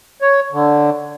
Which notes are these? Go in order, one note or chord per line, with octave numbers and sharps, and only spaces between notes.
C#5
D3